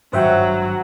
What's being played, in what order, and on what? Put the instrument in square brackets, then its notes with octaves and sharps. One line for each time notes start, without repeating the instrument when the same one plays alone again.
[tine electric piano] G#1 G2 F#6 [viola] F#3 [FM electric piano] C5 E5 G5